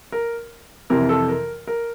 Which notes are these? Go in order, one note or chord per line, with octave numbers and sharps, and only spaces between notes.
A#4
F2 C3 E3 A#4
A4
A#4
A#4